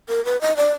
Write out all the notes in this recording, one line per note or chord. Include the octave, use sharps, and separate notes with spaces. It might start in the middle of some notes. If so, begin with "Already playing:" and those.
A#4
B4
D#5
D5